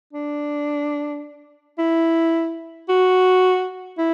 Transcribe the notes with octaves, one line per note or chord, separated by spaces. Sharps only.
D4
E4
F#4
E4